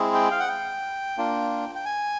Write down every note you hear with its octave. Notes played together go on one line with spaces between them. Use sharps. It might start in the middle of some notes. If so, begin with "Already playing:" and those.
Already playing: G#3 C4 E4 G#4
G5
F5
F#5
G5
A#3 D4 F4
G5
G#5